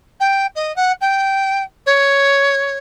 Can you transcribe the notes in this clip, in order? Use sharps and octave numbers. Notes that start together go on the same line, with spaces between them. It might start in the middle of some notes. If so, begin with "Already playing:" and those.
G5
D#5
F#5
G5
C#5